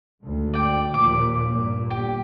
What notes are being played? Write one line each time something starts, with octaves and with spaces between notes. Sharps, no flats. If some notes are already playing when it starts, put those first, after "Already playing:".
D2 G#2
D5 G5
D#2 A#2 F3 D6
G2 A#2
G1 G4